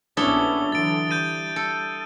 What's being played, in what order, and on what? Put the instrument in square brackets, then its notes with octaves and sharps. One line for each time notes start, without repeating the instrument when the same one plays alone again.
[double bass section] A#1 B3 C#4 [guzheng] D4 E4 A4 [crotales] D#6 G7
[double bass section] D3 E3 F#3 [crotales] A6 D7
[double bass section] G3 [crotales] G6 A6 D#7
[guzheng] A4